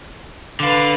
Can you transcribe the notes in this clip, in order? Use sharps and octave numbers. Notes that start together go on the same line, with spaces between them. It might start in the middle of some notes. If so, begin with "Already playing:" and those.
D3 B4 F5